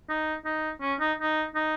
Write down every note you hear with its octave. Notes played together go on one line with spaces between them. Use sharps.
D#4
D#4
C#4
D#4
D#4
D#4